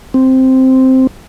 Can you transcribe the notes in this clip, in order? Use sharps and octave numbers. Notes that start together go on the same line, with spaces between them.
C4